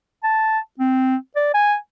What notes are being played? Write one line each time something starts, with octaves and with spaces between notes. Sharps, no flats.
A5
C4
D5
G#5